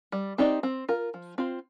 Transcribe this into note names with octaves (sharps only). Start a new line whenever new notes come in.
G3
C4 D#4 G4 D5
C4
F4 A#4
F3
C4 F4 C5